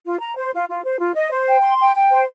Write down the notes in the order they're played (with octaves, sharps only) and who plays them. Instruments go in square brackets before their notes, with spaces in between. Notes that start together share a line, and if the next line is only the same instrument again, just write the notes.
[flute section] F4
A#5
C5
F4
F4
C5
F4
D#5
C5
G5
C6
G5
G5
C5